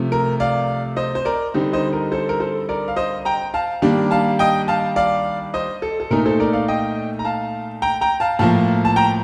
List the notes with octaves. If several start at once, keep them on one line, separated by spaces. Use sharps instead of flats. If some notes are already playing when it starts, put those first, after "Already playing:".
Already playing: C3 F3 A3
A#4
D5 F5
C5 D#5
C5
A#4 D5
D3 G3 C4 D#4
C5 D#5
A#4
A4 C5
A#4
A4 C5
A#4 D5
F5
C5 D#5
G5 A#5
F5 A5
D#3 G3 A#3 D4
F5 A5
D#5 G5
F5 A5
D5 F5
C5 D#5
A4
A4
A#2 A3 D#4 A#4
A4 C5
A#4 D5
D5 F5
D#5 G5
A#5
F5 A5
G5 A#5
G5 A#5
F5 A5
A2 F3 A#3 F5 A5
A5
G5 A#5